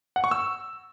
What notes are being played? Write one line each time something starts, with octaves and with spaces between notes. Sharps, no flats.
F#5
C#6
E6